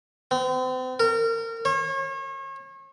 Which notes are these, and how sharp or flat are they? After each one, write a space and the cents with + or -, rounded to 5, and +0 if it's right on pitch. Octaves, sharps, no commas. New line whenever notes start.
C4 -40
A#4 -30
C#5 -35